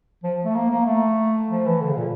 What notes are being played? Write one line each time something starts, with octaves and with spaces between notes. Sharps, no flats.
F3
A3
A#3
A#3
A3
F3
E3
D3
C#3
A#2